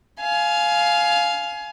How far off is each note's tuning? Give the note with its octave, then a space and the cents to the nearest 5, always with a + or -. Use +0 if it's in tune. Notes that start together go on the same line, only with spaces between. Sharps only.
F5 +0 G#5 +25